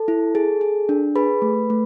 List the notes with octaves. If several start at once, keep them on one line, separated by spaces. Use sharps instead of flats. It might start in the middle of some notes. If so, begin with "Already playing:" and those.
Already playing: A4 A5
E4
G#4
G#4
D4
G#4 B4 B5
A3
A3